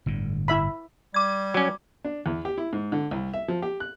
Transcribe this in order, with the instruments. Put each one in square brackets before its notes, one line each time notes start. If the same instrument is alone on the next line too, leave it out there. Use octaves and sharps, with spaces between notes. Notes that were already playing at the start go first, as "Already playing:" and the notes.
[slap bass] G1 A2 D3
[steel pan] E4 E5 B5
[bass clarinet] G3 [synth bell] D6 G#6
[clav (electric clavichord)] F#3 C#4
[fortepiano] D4
E2
G4
E4
G#2
D3
C2
E5
F3
G4
F#6